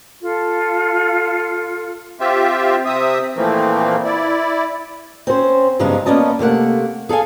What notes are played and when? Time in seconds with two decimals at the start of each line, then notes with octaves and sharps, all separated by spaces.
0.20 F4 A4
2.20 C4 F4 G4 E5
2.85 C3 C4 E5 D#6
3.36 A#2 E3 F3 A3 A#3 C4
4.05 E4 D5
5.27 C4 C#4 C5
5.79 G2 C#3 F3 G#3 B3 D#4
6.06 A#3 B3 C#4 D5 D#5 A5
6.39 C3 A3 A#3 F#5
7.09 G#4 A4 F5 G#5